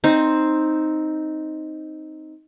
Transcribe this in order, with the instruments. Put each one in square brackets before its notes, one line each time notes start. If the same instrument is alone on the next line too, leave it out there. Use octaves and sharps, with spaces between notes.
[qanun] C4 D#4 C5